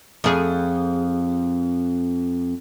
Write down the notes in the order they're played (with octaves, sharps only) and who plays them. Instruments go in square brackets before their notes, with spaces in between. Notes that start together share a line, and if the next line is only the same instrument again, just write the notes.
[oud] F2 G#4